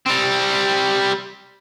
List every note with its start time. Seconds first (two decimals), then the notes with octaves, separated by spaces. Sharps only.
0.07 G3 C4